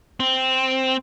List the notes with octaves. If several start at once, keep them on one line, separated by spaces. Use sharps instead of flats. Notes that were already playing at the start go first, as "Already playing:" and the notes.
C4